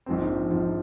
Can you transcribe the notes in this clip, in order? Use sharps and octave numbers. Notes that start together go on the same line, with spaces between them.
A#1 G#2 F3 C4
A#1 G#2 F3 C4